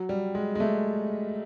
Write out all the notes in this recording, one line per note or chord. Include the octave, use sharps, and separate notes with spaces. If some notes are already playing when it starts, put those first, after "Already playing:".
Already playing: F#3
G3
G#3
G#3
A3